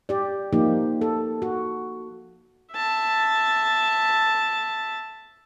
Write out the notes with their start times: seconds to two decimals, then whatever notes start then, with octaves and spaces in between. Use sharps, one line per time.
0.09 G4 D5
0.53 F3 A#3 D#4 G4
1.01 A4
1.42 F#4
2.73 E5 A5